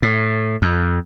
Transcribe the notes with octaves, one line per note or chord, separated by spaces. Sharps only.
A2
F2